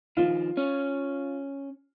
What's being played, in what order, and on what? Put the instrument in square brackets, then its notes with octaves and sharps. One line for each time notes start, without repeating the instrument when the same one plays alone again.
[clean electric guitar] D#3 F3 [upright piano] F4
[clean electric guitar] C#4